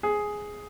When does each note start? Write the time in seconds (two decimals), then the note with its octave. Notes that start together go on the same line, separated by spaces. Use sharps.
0.03 G#4